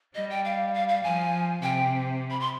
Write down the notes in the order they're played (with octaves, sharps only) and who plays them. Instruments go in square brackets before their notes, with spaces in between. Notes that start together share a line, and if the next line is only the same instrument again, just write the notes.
[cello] G3 [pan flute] D#5
[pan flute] G5
F5
F5
F5
[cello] F3 [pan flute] G#5
[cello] C3 [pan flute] G5
[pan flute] B5
C6